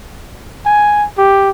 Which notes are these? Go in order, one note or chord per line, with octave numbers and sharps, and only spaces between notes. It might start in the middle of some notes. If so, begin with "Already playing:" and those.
G#5
G4